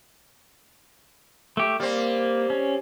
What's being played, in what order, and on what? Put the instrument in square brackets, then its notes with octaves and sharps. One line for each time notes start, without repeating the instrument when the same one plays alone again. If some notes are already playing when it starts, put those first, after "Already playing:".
[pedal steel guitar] A3 G4
[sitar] G3 C4 [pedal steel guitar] A#3
[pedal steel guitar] C#4